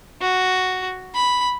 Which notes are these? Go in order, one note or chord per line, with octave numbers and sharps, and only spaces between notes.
F#4
B5